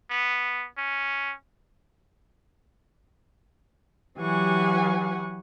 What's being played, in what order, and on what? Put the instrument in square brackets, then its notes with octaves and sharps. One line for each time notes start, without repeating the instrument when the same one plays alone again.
[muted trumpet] B3
C#4
[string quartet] E3 F#3 G4 F#5 G#5 C#6